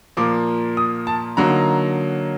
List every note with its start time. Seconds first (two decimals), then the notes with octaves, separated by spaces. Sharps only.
0.17 A#2 F3 A#3 D6
0.77 D#6
1.07 A5
1.37 D3 F#3 A#3 D#4 A#5